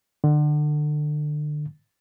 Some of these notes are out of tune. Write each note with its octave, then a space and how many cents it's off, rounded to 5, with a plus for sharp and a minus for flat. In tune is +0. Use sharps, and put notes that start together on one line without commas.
D3 +30